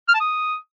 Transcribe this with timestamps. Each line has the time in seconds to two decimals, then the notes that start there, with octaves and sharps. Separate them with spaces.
0.08 F6
0.14 A5
0.20 D#6